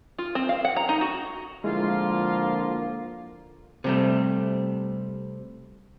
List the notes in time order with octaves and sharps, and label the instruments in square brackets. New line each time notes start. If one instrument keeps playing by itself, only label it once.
[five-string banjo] F4
C4
F5
F#5
A#5
D#4
F#4
[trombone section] D3 F3 A#3 [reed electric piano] G#3 E4 [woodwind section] F4
[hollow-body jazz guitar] C3 G3 A3